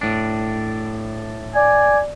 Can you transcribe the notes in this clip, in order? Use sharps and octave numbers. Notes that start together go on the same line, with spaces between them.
A2 D4
D5 G#5